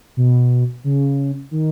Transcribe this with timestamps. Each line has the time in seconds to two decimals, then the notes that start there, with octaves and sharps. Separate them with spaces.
0.17 B2
0.84 C#3
1.51 D#3